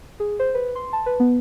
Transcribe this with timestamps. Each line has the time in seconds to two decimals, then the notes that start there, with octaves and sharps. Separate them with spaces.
0.20 G#4
0.39 C5
0.54 B4
0.75 C6
0.93 A5
1.06 B4
1.20 B3